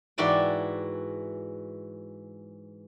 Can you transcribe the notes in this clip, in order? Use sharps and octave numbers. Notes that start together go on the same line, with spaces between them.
G#2 E3 E4 F#4 D5 G5